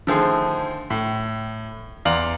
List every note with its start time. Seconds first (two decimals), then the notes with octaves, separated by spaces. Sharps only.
0.07 D3 D#3 F3 A3 G#4
0.90 A2
2.05 E2 D5 F5 A#5 C6 F#7